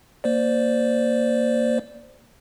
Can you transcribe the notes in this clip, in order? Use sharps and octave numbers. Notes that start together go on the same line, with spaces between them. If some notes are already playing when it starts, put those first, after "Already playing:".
A#3 C5 D5